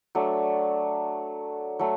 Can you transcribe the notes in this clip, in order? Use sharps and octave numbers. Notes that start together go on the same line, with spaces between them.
F#3 A3 D4
F#3 A3